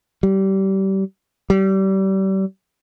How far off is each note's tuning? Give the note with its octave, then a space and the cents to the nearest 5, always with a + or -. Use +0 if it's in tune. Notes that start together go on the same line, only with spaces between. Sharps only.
G3 -25
G3 -30